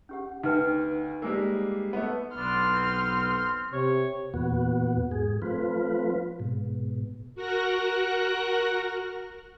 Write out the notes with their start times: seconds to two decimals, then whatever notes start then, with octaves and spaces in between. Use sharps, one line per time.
0.09 C#4 G4 F#5
0.43 D2 D#4 B4 G5
1.22 G3 G#3 A#3 A#4 C5 G#5
1.93 A3 B3 B5
2.37 B1 B3 D4 C6 F6
2.71 C4
3.73 C3 C#5
4.34 E2 A#2 B3 F#4
5.11 G#2 G#4
5.42 F3 A3 C4 F4 B4
6.40 G#2 B2
7.35 F#4 A#4 F#6 A#6